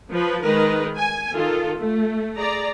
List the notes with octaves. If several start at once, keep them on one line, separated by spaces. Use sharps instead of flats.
F3 B4
D#3 G#3 A#4 B4
G#5
D#3 F4 A4
A3
G#4 D5 A#5